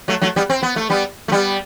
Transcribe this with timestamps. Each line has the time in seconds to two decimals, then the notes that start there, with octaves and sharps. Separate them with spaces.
0.08 F#3 A3
0.22 F#3 A3
0.36 G3 B3
0.50 C4
0.63 B3
0.76 A3
0.90 G3 B3
1.28 A3
1.32 G3 B3